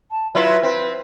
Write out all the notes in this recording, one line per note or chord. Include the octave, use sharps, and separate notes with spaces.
A5
F#3 E4 F4 B4 E5
C4 B4